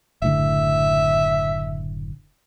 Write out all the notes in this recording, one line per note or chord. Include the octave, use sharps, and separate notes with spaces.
F#1 A2 D3 E5